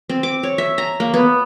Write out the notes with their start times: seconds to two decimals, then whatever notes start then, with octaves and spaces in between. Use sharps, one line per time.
0.09 C4
0.23 D6
0.43 C#5
0.58 E5
0.78 A#5
1.00 A#3
1.14 B3